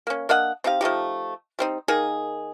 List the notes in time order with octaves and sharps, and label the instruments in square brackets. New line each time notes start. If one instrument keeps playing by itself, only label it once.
[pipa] A#3 C#4
A#3 D4 D#5 F#5
C4 D#4 G4 F5
F3 A3 D#4 G4
G3 C4 D#4
D#3 A#3 D#4 G#4